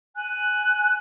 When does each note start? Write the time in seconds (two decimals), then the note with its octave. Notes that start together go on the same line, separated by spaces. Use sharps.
0.16 G#5 F#6